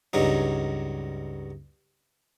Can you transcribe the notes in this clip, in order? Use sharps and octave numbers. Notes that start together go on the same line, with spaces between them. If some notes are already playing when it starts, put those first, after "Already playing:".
C#2 G2 F#3 D#4